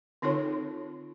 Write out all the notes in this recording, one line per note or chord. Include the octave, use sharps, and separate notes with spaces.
D3 C4 D#4 F4 A4 C#5